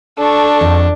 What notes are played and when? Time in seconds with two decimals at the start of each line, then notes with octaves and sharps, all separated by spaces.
0.18 D4 A4 C#6
0.61 F2